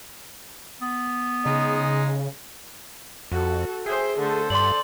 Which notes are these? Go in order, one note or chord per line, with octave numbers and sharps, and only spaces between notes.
B3
C#3 G#3 D#4
F2 F#4 A4
G#4 C5 E5 G5
D3 A3 A4 C5
G2 D5 C6 F#7